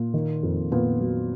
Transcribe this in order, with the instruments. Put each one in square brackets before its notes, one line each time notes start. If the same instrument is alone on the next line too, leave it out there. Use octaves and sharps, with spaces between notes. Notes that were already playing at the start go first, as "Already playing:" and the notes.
Already playing: [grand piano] A#2 [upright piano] A#3
[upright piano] D#3
F2
[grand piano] A#2 [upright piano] B3
[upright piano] F#3